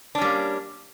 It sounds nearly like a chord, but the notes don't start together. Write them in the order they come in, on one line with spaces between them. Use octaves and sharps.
D4 C#4 G3 A#3